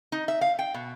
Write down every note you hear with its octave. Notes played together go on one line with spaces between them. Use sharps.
D#4
E5
F5
G5
B2